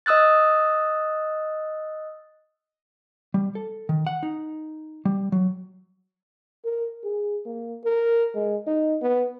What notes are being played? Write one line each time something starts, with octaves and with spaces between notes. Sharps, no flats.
D#5 D#6 E6 F#6 A6
G3
A4
D#3
F#5
D#4
G3
F#3
A#4
G#4
A#3
A#4
G#3
D#4
B3